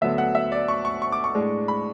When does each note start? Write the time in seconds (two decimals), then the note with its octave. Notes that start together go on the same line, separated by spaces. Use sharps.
0.01 D2 D3 F#3 B3 E5
0.18 F#5
0.35 E5
0.52 D5
0.68 C#6
0.85 C#6
1.02 C#6
1.12 D6
1.24 C#6
1.35 A2 G#3 D4
1.68 B5